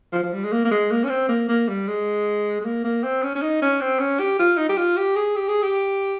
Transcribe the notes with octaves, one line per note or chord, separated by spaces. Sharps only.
F3
F3
G3
G#3
A#3
A#3
G#3
A#3
C#4
C4
A#3
A#3
G3
G#3
G#3
A#3
A#3
C4
C#4
C#4
D#4
C#4
C4
C#4
G4
F4
D#4
G4
F4
G4
G#4
G4
G#4
G4